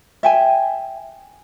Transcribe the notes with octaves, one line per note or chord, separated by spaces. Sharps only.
E5 G5 G#5